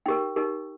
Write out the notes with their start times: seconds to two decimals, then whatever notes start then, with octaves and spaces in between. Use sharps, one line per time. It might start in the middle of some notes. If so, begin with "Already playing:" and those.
0.06 D#4 G4 A#4 G5
0.36 D#4 G4 A#4